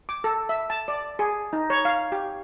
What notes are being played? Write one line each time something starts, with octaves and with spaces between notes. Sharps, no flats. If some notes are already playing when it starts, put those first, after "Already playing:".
D6
A4
E5
A5
D5
G#4
D#4
C#5
F5
G4